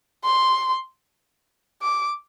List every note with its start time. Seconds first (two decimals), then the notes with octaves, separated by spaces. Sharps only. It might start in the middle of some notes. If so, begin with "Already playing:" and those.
0.25 C6
1.82 D6